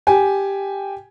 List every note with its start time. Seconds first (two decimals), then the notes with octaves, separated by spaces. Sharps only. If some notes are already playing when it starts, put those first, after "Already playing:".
0.07 G4 G#5